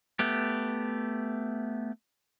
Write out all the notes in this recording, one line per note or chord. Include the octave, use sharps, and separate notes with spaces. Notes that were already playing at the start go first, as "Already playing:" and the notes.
A3 B3 G4